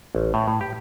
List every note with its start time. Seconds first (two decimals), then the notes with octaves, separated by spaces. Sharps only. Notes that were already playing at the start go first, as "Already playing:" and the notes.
0.15 A1
0.34 A2
0.48 A2
0.61 G4